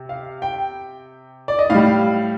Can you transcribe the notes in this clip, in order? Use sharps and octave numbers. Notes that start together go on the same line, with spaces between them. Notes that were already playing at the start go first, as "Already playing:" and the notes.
Already playing: C3
F5
G5
D5
D#5
A2 G3 F5